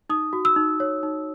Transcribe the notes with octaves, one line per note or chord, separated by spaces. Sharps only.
D#4 D#6
F#4
E6
D#4
C#5
D#4